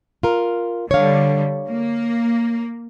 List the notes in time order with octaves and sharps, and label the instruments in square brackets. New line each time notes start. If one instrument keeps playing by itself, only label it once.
[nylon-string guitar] F4 A#4
[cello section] D3 G3 [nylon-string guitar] C#5 F5
[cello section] A#3